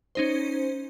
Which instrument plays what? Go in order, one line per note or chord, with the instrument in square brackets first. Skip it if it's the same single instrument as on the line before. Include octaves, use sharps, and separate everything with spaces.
[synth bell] C#4 D#4 C5